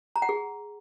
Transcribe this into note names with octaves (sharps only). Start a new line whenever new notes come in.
A#5
F#5
G#4